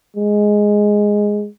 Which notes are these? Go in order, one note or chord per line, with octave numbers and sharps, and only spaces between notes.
G#3